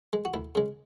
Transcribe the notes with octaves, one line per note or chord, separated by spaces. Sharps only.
G#3
F#4
D2 E4
C#3 G#3